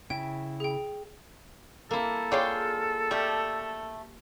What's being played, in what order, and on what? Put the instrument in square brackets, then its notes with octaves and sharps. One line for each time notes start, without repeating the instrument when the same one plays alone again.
[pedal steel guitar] C#3 E4 [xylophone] G5
[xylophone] G#4 G5
[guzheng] A#3 E4 [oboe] A4
[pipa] D3 C#5 D5 [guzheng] F4 G#4 G5
[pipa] G3 A3 [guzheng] G4